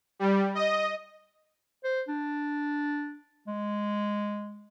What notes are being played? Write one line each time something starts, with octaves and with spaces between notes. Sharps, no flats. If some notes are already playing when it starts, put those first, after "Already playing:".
G3
D#5
C5
D4
G#3